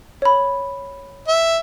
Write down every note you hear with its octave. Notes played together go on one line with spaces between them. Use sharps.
C#5 B5
E5